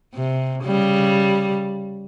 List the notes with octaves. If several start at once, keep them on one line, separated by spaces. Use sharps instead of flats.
C3
C#3 G3